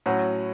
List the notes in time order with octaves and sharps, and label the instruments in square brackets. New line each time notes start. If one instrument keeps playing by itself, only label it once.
[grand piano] A2 F#3 C#4 F#4